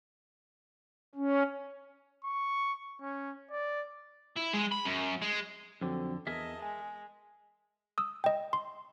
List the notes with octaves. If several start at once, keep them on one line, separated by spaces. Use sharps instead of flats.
C#4
C#6
C#4
D5
E4
G#3
B5
F#2
G#3
F2 D3 F#3 C4 F#4
E2 G#4 A#4 D#5 E5 A5
G#3 G#5
D#6 E6
D#5 G5
C6